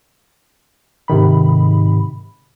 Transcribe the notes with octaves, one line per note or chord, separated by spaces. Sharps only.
G#2 C3 D#3 B5